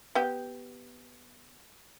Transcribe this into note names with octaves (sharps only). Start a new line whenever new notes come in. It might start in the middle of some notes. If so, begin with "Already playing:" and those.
B3 G4 G5